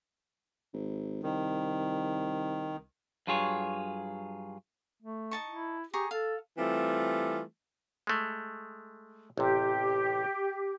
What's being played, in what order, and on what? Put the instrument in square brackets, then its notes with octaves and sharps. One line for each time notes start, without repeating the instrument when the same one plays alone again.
[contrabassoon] G#1
[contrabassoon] C2 [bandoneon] D#3
[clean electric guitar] G2 F#3 F4 G#4 C#5
[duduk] A3
[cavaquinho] D#4 A5 C#6
[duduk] E4
[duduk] G4 [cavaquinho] G#4 A#5 C#6
[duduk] A4 [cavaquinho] F5
[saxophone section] E3 G3 A3 C4 F4
[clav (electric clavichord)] G#3 A3
[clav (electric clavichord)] A1 C3 [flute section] G4